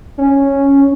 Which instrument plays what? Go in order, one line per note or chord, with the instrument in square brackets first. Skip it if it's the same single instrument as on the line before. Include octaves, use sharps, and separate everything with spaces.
[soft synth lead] C#4